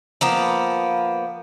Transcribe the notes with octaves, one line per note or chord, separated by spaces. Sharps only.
F3 A#3 B3